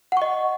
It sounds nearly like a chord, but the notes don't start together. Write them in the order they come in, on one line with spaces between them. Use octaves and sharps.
F#5 C#6 D#5